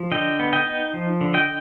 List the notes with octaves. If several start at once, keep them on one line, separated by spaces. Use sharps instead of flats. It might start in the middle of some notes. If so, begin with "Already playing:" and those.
Already playing: F3
D3 D#5 G5
B3
D#5 G5
D#4
F3
D3
D#5 G5